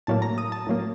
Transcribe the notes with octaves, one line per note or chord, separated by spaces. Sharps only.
A2 F#3 A#3 A5
A#5
D#6
A5
A2 F#3 A#3